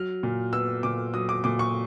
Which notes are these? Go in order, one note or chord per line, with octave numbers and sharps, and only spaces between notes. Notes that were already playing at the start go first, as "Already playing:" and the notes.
Already playing: F#3 F6
A#2
B3 E6
A#2 D6
F#3 D#6
D6
A#2 D6
C#6